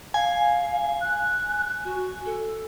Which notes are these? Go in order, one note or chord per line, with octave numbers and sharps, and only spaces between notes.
F5 G#5
F#6
F#4
A4